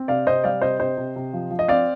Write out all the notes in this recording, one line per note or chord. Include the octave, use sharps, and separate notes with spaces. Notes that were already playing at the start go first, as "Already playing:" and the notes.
Already playing: C4
C3 D5 F5
C3 C5 D#5
G3 D5 F5
C3 C5 D#5
C3 C5 D#5
C3
C3
F3
F3
D#5
C4 D5 F5